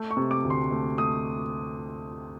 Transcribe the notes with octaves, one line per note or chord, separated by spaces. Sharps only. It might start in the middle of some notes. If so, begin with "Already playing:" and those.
Already playing: A3
C#6
C3
D6
D2
C6
A3
A3 D#6